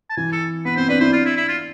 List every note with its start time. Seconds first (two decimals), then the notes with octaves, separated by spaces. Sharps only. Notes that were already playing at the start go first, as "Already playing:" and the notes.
0.10 A5
0.17 E3 G#5
0.32 A4
0.65 B3 B4
0.76 C4 C5
0.89 D4 B4
1.00 E4 C5
1.12 D4 F4
1.25 E4
1.37 E4
1.48 F4